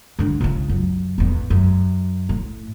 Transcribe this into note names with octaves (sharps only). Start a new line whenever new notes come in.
G2 D3
C#2 C#3
F#2
A1 E2
F#2
A2